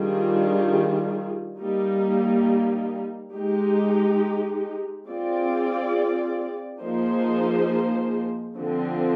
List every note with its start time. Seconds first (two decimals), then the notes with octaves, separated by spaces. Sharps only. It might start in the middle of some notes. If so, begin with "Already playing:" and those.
Already playing: D#3 G3 D4 F4 G#4
1.58 G3 A#3 D#4
3.33 G#3 D#4 G4
5.07 C4 F4 G#4 D5
6.81 F3 A#3 D#4 G#4 C5
8.56 D3 F3 C4